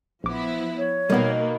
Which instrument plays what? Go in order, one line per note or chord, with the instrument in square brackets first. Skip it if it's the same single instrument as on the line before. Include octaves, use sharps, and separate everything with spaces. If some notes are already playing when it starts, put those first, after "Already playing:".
[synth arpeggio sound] A#1 D6 [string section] F3 B3 E4
[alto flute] C#5
[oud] B2 D#3 [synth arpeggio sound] G3 B3 [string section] A#3